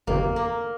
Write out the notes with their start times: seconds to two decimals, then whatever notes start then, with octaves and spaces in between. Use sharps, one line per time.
0.07 G1 F2 C3 A#3
0.36 A#3